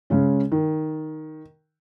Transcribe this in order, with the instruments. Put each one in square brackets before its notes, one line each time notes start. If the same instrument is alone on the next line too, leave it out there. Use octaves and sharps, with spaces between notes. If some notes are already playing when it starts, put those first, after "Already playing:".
[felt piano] C#3 G#3 C#4
D#3